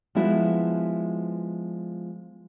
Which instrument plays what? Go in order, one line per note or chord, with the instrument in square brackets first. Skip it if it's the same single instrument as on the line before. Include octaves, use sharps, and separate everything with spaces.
[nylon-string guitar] F3 G#3 B3 E4 F#4